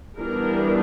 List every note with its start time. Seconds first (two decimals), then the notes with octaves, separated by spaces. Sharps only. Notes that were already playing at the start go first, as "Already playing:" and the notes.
0.18 E3 G3 B3 D4 A#4